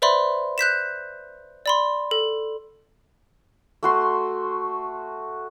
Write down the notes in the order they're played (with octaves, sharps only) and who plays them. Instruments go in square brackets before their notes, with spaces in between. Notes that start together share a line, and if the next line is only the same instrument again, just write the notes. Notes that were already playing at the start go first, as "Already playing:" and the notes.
[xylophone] B4 C5 D5 E5 B5 C6
F#6 G6 B6 E7
D5 B5 C6
A4
[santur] A3 F#4 C6